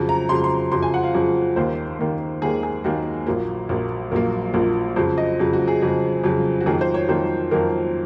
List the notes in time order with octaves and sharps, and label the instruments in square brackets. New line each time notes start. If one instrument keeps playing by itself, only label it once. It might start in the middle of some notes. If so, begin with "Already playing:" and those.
Already playing: [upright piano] F2 C#3 F#3
A#5
F2 C#3 F#3 C6
C6
F2 C#3 F#3 C6
G#5
F#5
F5
F2 C#3 F#3
D#2 D#3 A#3 C5
D#2 D#3 A#3
D#2 D#3 A#3 G#4
G#4
D#2 D#3 A#3 F#4
A#1 A#2 F#3 A#3
A#1 A#2 F#3 A#3
A#1 A#2 F#3 A#3 A#4
A#1 A#2 F#3 A#3
F2 C#3 F#3 C5
D#5
F2 C#3 F#3
F#4
G#4
F2 C#3 F#3
F2 C#3 F#3
F#4
F2 D#3 F#3 A#3 G#4
C5
C#5
F2 D#3 F#3 A#3 C5
F2 D#3 F#3 A#3 A#4